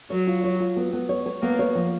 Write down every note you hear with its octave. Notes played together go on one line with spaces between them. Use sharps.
F#3 C#5
F4
C#5
F4
B3
B3
C#5
C#5
A#3 B3
C#5
F3